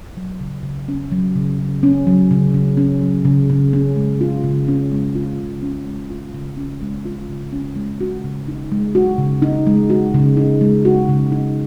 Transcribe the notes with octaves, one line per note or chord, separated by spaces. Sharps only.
F#3
C#3
C#3
C#4
F#3
C#3
C#3
C#4
F#3
C#3
C#3
C#4
F#3
C#3
C#3
C#4
G#3
F4
C#3
C#4
G#3
F4
C#3
C#4
G#3
F4
C#3
C#4
G#3
F4
C#3
C#4
G#3
F#4
C#3
D#4
G#3
F#4
C#3
D#4
G#3
F#4
C#3
D#4
G#3
F#4
C#3
D#4